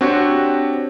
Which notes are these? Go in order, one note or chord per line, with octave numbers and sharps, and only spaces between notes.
C4 D4 F#4 G4 C#5